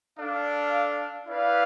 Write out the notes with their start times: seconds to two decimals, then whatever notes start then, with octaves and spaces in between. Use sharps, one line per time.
0.18 D4 A4 D5 F5
1.27 E4 B4 D5 F5